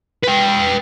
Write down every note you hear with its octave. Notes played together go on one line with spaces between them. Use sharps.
B4 G5